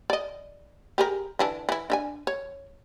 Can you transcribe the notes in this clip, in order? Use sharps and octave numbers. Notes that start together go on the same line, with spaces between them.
D5 D#5
G4 G#4 A#4
D3 E3 D4
E3 E4
D4 E5 G#5
C#5